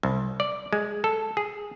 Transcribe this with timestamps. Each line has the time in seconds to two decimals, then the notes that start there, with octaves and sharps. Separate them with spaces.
0.03 C2
0.40 D5
0.73 G#3
1.04 A4
1.37 G#4